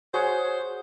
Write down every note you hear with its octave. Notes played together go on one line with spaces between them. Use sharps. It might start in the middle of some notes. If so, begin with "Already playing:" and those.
F#4 G#4 C5 C#5 F#5